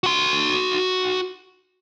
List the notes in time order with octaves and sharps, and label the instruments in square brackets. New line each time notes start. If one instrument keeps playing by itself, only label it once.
[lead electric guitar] F#4 C6